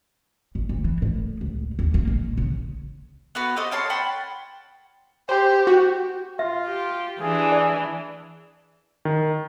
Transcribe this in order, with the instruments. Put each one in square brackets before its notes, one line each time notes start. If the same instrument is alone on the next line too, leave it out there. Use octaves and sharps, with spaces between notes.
[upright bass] A1
D2
E3
A2
C#2
D#2
A#3
A#1
C#3
[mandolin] B3 F#4 B4
G4 A4 C5 D#5
A#4 C#5 A5 C6
F#5 G5 A5 B5
[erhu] G4 [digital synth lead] C5
[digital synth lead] F#4
[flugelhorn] F4 [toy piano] E5
[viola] G4
[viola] E3 D4 [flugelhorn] G#4
[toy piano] D5
[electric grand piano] D#3